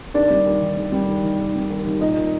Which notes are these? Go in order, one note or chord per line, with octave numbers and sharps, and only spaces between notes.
D#2 D4 D5
G3
D#2
D#3
D#2
G3
D#2
D#3
D#2
G3
D#2
D#3
A#2 D#4 D#5
A#2